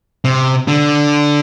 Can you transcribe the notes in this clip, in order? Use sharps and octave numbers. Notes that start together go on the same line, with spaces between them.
C3
D3